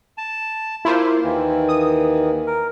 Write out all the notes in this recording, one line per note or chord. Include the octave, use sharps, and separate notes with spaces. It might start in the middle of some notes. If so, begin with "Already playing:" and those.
A5
A#3 E4 F4 C5
D#2 D#3 E3
D#6
A#4